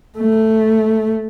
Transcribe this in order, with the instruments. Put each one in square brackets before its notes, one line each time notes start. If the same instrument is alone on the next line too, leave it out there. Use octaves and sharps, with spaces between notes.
[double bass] A3